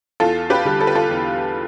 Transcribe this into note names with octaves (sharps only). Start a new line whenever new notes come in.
E2 F4 A4
G4 B4
D3 G3
A4
B4
F4 A4
E2